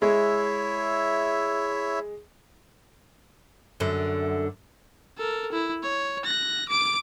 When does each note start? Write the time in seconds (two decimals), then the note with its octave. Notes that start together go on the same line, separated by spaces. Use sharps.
0.02 G#3 E4 C#5 E5
3.80 F#2 D3
5.18 A4 A#4
5.52 E4
5.83 C#5
6.25 F#6 A#6
6.69 D6 D7